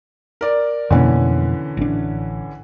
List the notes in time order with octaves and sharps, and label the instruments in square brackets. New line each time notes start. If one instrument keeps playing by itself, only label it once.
[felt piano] A#4 D5
[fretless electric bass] F2 B2 A#3 [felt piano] D3 E3 C#4
[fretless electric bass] A1 D4